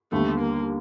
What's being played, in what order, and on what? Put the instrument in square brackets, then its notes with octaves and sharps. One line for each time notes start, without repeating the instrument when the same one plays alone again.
[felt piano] D#2 D3 G3 B3 [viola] A3
[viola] A#3